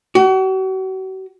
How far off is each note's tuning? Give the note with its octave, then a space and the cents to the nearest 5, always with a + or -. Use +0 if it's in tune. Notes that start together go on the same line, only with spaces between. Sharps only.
F#4 +40